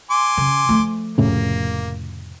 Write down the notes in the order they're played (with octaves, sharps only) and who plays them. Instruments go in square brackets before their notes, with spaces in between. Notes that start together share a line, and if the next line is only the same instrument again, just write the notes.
[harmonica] G#5 C6 D6
[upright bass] C#3
F3 A3
[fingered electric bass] F1 A2 C#3 [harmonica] A#3